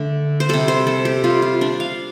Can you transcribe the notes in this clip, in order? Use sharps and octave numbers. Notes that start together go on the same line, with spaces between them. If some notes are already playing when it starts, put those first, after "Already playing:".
Already playing: D3 A3
C5
C3 G3 A4
C5
A4
G4
C3 G3 F4
F4
D4
F5